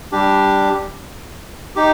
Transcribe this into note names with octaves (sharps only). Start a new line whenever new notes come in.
G3 D4 G4
D#4 G4